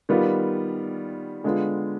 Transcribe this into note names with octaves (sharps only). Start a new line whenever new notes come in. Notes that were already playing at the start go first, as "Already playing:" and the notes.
D#3 G3 B3 F4
D3 G#3 B3 F4